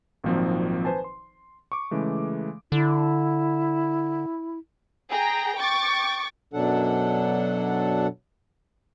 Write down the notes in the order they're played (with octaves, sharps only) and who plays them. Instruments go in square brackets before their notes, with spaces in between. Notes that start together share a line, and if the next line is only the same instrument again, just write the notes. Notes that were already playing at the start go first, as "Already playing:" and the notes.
[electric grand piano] G#1 A#2 D#3 F3 F#3 C4
B4 C5 G#5 A5
C6
C#6 D6
C#3 E3 G#3 A3
[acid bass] D3 [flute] E4
[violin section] G#4 G5 A#5
G5 C#6 D6 A6
[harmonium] F#2 B2 F#3 D4 A4 F#5